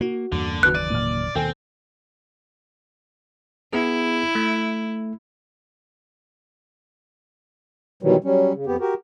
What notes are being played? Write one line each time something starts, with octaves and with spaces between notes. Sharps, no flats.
A#3 F#4
E2 G2 D3 A#3
F#1 D#2 E3 F#4 B4 F#6
D5 D#7
A#2 F6
D#2 B2 D#3 C4 A4 G5 G#5
B3 E4 G#4
A3
B2 D#3 E3 F#3 G3
F#3 G3 C#4
C#3
F2 B3 G4
F#4 G4 A#4